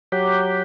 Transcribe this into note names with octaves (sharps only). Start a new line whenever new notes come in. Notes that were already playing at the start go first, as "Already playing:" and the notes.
F#3 G4